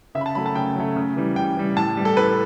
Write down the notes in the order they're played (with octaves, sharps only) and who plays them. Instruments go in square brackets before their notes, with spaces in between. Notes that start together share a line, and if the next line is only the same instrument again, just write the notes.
[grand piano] C#3 E5
B5
A5
F#3 A3 B5
A5
C#3 G5
F#3 A3
C#3
E3 G3
C#3 G5
E3 G3
A2 A5
E3 G3
A4
A2 B4